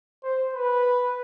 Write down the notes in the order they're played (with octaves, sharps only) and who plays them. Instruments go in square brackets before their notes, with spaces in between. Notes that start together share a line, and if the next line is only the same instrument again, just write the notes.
[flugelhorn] C5
B4